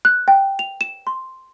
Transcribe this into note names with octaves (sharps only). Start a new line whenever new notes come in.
F#6
G5
F7
E7
C6